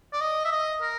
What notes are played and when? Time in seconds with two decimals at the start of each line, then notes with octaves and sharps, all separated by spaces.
0.13 D5
0.21 D#5
0.45 E5
0.52 D#5
0.81 A#4